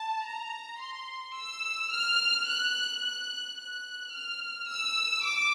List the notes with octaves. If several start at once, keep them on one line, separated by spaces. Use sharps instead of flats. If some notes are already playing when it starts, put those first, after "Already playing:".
Already playing: A5
A#5
C6
E6
F6
F#6
F#6
F#6
F6
E6
D6